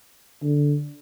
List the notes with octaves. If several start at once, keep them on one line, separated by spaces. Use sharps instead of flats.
D3